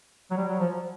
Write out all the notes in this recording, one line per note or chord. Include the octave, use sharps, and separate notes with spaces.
F#3
G3
F#3
F3